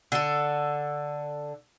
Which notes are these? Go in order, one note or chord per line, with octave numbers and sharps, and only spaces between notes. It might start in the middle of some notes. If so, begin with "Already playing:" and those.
D3 A4